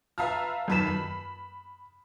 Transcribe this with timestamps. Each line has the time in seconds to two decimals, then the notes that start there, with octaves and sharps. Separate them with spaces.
0.18 B4 E5 F5 A5 A#5 F6
0.68 F#2 D#3 B4 A5 B6 E7
0.87 B5